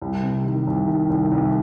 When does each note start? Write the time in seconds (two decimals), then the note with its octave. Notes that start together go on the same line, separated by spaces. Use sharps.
0.02 C2
0.23 C3
0.44 D#3
0.67 C2
0.87 D#3
1.10 C2
1.32 C2